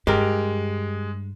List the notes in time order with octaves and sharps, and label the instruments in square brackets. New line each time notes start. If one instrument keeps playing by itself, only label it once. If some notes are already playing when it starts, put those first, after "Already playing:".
[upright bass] G2 [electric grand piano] G#3 [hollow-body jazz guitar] G4 A#4